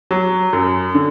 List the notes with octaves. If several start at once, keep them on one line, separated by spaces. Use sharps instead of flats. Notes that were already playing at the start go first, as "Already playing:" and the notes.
F#3
F#2
D3